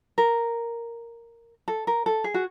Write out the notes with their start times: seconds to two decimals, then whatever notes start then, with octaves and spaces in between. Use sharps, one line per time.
0.18 A#4
1.68 A4
1.87 A#4
2.06 A4
2.24 G#4
2.34 F#4